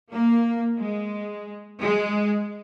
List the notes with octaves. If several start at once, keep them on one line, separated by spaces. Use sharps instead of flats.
A#3
G#3
G#3